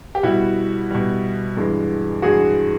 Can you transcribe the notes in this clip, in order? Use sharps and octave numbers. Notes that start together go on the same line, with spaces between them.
G4
B2 G3 E4 F#4
B2 G3
G2 E3 G#3
G2 E3 G#3 F#4 G#4